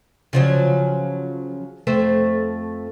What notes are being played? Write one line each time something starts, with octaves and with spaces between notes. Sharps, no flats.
C#3 F3 F#3
F2 A3 C5